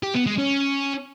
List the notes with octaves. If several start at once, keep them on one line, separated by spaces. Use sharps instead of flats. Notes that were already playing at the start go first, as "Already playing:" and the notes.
G4
B3
G#3
C#4